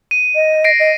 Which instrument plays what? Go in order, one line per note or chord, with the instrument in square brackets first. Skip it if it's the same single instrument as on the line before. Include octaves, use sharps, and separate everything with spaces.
[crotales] D#7
[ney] D#5
[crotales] A#6 C7 D7
[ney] D#5